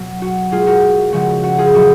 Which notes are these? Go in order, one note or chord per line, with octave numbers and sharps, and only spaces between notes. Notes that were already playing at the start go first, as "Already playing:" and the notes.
Already playing: B2 F#3
F#4
B2 G#3 F4 G#4
F#4 A#4
C#3 F3 G#3 F#4
F#4
F4 G#4
A#2 F#3 F#4